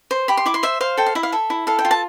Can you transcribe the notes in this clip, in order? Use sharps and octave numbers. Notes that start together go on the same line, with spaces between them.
C5
G4 B5
C6
E4 D6
C6
C5 E5
C5 F5
A4 G5
F5
E4 E5
F5
A4 E5
E4
A4 F5
G5
F4
A5